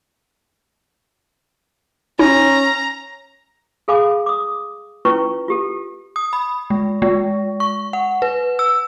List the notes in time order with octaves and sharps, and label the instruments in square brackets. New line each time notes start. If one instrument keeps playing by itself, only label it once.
[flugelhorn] C#4 [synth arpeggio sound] D#4 [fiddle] A#5
[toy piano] G#4 A4 F5 G#5 B5 D6
D6 D#6
C#4 E4 F4 B4 G5 C#6
F4 G4 A4
[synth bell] D#6
B5
G#3
G#3
C#6
F#5
B4
E6